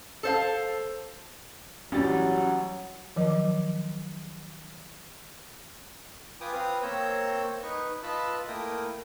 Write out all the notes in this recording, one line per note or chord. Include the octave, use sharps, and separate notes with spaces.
A4 C5 F5
A1 F#3 G3 C#4 A6
D#3 F3 F#3 D#5 D6
F4 B4 G5 G#5 D6 D#6
C4 B4 F5 D#6
A#3 C4 C#5 A#5 E6 G6
D#4 B4 C#6
F4 B4 D#5 A5 B5 E6
A3 A#3 E4 A#4 G5 D#6